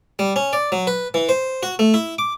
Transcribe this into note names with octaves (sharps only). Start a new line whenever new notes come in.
G3
C#4
D5
F#3
B4
E3
C5
F#4
A3
E4
D6